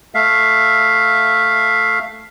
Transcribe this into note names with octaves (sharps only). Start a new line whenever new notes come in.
A3 E5 F5